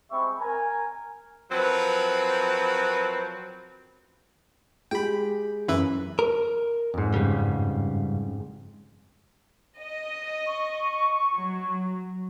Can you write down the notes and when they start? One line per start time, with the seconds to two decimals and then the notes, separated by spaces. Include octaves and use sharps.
0.11 G3 G#3 C4 E5 B5 C#6
0.40 A#4 G#5
1.51 F3 F#3 C4 A#4 B4
4.91 G#3 G4 G5 B5
5.68 F#2 E3 B4 E5
6.19 A#4
6.94 F2 G#2
7.14 G2 C#3 G3
9.80 D#5
10.46 C#6
11.33 F#3